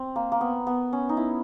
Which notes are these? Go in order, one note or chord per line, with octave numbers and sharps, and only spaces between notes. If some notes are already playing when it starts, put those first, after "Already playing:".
Already playing: C4
A#3
A#3
B3
B3
C#4
D#4
E4